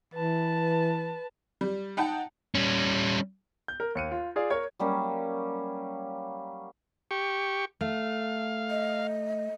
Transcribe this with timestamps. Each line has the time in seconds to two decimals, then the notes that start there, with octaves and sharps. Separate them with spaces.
0.14 E3 B4 A5
1.61 G3
1.97 D#4 F#5 G5 A5
2.55 G3 C#4
3.68 G6
3.80 A#4
3.95 D#2 C#7 D#7
4.11 F4
4.36 F4 G#4 D5 F5
4.50 A#4 C#5 G#6
4.79 F#3 G3 A#3 C#4
7.11 G4 C#6
7.81 A3 F5
8.70 D#5